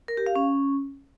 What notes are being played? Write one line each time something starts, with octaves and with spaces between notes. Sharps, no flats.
A#4
G4
F5
C#4